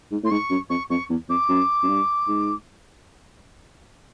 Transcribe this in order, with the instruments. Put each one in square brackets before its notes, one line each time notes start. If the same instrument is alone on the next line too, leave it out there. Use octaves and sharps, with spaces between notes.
[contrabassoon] G#2
[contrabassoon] A2 [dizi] C6
[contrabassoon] G#2 [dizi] C#6
[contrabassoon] F#2
[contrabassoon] F2 [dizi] C#6
[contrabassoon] F2 [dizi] C#6
[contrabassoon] E2
[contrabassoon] F2 [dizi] D6
[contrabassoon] F#2
F#2
G2
G#2